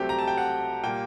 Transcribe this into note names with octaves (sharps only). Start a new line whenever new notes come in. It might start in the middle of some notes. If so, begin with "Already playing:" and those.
Already playing: C2 C3 F#3 A3 C4 G4
A#5
A5
G5
F#5
A#2 G3 A#3 G5